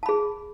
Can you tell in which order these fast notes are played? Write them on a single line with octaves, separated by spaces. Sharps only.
A5 B5 G#4